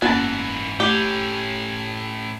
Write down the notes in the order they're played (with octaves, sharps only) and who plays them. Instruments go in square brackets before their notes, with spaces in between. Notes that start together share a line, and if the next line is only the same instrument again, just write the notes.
[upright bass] F#1 [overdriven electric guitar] G#2 E3 [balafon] A#3 B3 C#4 [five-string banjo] F#4 A5
[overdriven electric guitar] A2 C#4 [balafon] A3 [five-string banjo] G4